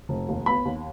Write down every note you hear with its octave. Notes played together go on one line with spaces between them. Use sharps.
F1
D#2
B3 B5
D#2